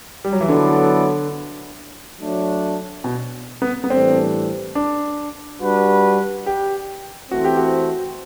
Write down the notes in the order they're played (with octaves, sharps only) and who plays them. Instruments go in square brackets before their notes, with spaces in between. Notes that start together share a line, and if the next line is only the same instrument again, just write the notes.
[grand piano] G3
F#3
E3
[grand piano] D3 [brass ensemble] F#3 B3 E4 A4 D5
[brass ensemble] F#3 A3 D4
[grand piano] B2
B3
B3
[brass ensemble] A2 E3 G3 D4 A4 [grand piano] C4
[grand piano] D4
[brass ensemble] G3 D4 F#4 B4
[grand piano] G4
[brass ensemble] E3 A3 C4 [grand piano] F#4
[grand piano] G4
F#4